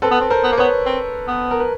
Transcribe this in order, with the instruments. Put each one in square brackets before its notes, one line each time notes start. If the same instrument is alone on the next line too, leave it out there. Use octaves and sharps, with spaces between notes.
[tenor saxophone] C4 [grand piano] A4 B4
[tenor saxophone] B3
C4
[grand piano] A#4 C5
[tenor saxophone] B3
A#3
[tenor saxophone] B3 [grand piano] B4 C#5
[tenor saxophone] C4
B3
[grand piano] A#4
B4